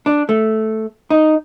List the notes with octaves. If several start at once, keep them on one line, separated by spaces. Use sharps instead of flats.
D4
A3
D#4